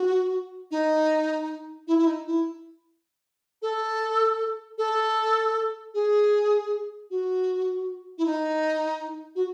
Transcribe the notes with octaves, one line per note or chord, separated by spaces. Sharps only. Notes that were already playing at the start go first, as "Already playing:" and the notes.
Already playing: F#4
D#4
E4
E4
D#4
E4
A4
A4
G#4
F#4
E4
D#4
F#4